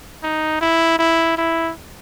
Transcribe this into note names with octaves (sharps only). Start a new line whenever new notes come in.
D#4
E4
E4
E4